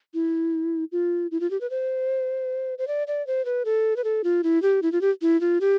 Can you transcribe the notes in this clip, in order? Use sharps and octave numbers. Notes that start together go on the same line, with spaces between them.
E4
F4
E4
F4
G4
B4
C5
C5
D5
D5
C5
B4
A4
B4
A4
F4
E4
G4
E4
F4
G4
E4
F4
G4